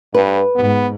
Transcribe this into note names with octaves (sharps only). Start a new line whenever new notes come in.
G2 B4
G#2 B3